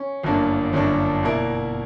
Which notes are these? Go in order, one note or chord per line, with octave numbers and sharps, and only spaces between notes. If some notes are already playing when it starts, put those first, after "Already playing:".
Already playing: C#4
G1 F#2 D3 A#3 D4
G1 F#2 D3 A#3 D4
B2 A#3 E4 A#4 D5